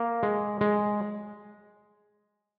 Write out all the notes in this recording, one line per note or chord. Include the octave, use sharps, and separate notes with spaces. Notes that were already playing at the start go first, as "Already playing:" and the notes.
Already playing: A#3
G#3
G#3